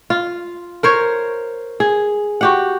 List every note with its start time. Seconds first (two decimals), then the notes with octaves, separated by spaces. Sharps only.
0.10 F4
0.83 A#4 C5 C#5
1.80 G#4
2.41 F#4 G4 F#5